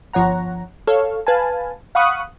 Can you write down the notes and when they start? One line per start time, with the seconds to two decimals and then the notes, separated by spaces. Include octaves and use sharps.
0.13 G1 F3 C#5 F#5 A#5
0.87 A4 C#5 F5
1.27 B4 F5 G#5 A5
1.95 F5 F#5 B5 C#6 D#6 F#6